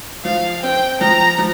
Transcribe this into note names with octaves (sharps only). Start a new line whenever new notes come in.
F3 F5
C4 G5
F3 A#5
F3